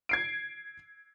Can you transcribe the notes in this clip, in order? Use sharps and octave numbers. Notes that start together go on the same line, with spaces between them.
G#6 C7 D7